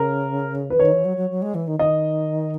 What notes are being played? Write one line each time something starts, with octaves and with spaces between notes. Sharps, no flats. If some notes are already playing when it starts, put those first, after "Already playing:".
Already playing: C#3 A#4
E3 B4
D#3 C#5
E3
F#3
F#3
F#3
G#3
E3
D#3
D#3 D#5